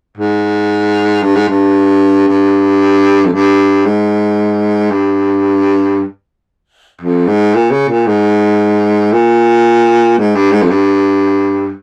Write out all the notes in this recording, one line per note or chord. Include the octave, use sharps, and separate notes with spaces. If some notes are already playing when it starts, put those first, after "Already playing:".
G#2
G2
G#2
G2
G2
F2
G2
G#2
G2
F2
G#2
A#2
C#3
A#2
G#2
A#2
G#2
G2
G#2
F2
G2